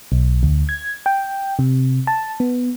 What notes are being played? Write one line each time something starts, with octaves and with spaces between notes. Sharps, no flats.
B1
D2
G#6
G5
C3
A5
B3